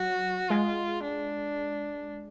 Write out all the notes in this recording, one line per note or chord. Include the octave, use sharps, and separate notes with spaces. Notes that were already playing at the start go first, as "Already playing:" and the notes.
Already playing: F#3 F#4
G#3 F4
D4